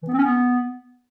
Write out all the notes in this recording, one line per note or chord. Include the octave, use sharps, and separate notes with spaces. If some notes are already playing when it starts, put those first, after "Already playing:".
E3
B3
C4
C#4
B3